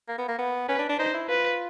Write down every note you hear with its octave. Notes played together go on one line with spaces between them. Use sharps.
A#3
B3
A#3
B3
C#4 B4
D4
D4
D#4 C5
E4
F4 B4